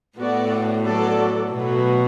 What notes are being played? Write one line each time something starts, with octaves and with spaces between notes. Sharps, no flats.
A2 B3 F#4 A4 D5
F#3 B3 F#4 A4 D5
B2 F#3 A3 F#4 B4